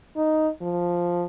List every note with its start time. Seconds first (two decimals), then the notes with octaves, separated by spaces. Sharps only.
0.16 D#4
0.62 F3